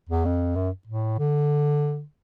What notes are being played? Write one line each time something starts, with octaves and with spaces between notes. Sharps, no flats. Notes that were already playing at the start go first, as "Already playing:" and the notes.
E2
F2
F#2
A2
D3